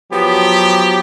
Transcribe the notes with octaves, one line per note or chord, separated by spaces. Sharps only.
F3 F#3 B3 G4